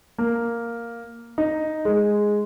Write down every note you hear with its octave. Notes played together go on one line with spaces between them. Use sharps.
A#3
D#4
G#3